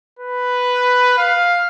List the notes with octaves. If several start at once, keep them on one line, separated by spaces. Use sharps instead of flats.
B4
F5